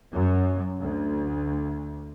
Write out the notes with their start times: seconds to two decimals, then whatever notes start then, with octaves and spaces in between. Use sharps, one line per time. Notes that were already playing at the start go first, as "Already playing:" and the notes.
0.13 F#2
0.79 D2